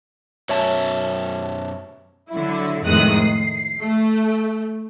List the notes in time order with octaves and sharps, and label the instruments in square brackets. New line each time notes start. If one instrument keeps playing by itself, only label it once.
[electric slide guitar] F#2 B2 [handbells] C#5 E5 A5
[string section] D3 F#3 E4
F2 A2 D#3 G#3 D#6 F#6
C7
A3